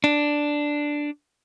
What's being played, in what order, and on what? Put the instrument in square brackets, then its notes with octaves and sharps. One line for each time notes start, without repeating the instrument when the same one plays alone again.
[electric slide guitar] D4